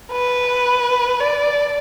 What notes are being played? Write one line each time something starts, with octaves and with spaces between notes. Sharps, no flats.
B4
D5